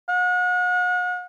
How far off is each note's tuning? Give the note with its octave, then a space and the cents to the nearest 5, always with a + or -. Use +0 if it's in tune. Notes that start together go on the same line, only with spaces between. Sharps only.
F#5 -40